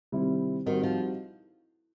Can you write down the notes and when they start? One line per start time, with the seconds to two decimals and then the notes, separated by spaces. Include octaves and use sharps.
0.12 C3 D#3 G3 C4 E4
0.66 D#3 G3 C4 D#4 F#4
0.84 F3